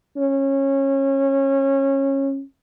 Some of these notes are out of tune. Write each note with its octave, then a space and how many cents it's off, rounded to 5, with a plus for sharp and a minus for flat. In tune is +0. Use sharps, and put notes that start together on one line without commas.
C#4 -20